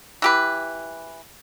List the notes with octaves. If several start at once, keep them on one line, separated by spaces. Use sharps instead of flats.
E3 G4 B4